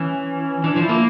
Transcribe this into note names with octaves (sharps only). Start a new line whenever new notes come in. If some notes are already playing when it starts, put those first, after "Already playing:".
Already playing: E3 C#4
E3 D4
F3
E4
A#3